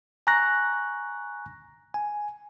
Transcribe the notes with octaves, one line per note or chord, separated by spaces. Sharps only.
G#5 A#5 C#6 F#6 A#6
G#5